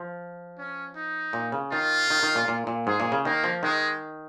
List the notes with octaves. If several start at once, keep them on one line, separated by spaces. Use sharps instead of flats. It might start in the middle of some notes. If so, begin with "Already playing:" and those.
Already playing: F3
C#4
D#4
A#2
C#3
D#3 F4
D#3
D#3
A#2
A#2
A#2
G#2 G#4
A#2
C#3
D#3 A#3
F3
D#3 G#3